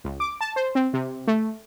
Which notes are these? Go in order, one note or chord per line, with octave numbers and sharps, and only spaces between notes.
C#2
D6
A5
C5
C4
C3
A3